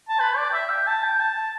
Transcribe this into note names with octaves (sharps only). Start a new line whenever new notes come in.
A5
B4
D5
G5
E5
G5
A5
G5
A5